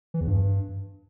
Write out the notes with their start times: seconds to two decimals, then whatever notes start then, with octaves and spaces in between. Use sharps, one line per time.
0.14 E3
0.21 E2
0.27 G2